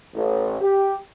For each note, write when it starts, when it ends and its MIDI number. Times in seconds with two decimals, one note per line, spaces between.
0.14 0.56 33
0.61 0.95 67